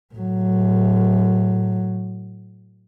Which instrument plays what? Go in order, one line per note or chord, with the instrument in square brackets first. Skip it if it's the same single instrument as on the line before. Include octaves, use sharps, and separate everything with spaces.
[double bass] A2 F#3